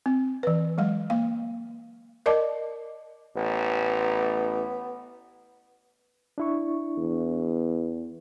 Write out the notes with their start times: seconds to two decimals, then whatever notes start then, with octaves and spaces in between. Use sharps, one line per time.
0.06 C4
0.43 E3 B4
0.78 F#3 G#3 F5
1.10 A#3 F5
2.26 A#4 D5 D#5 A5 D6
3.37 A1 B3
6.38 D4 E4 C#6
6.97 E2